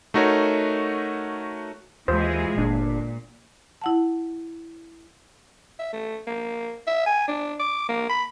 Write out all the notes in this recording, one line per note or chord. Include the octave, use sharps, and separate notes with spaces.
A3 D#4 F#4 A#4 C#5
D#2 E3 G#3 F4 G#4 C5
G1 A#2 D4
E4 F#5 A5
E5
A3
A#3
E5
G#5
D4
D6
A#3
B5